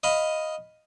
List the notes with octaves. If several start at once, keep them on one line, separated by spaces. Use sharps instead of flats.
D#5 F5 B5